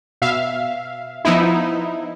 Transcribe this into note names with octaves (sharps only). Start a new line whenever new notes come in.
B2 E5 F5
F3 B3 D#4 E4